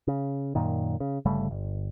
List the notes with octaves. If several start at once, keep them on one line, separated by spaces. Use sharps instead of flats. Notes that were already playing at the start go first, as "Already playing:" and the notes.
C#3
F#2 A#2 D#3
C#3
G1 C#3 G3 A3
G1